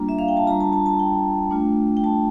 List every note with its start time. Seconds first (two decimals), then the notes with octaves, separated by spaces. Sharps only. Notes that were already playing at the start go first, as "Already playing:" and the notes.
Already playing: G3 A#3 D4 F4 A#5
0.09 E5
0.19 F5
0.28 G5
0.37 A5
0.46 G3 D4 F4 A#5
0.60 A5
0.73 A5
0.86 A5
0.99 G5
1.51 A3 D4 F4
1.97 G5
2.04 A5